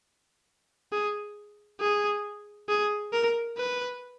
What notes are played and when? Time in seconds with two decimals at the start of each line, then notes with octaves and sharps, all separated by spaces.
0.92 G#4
1.81 G#4
2.69 G#4
3.13 A#4
3.57 B4